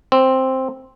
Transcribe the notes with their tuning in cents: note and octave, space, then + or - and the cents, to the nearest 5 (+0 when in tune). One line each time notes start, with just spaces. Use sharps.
C4 +5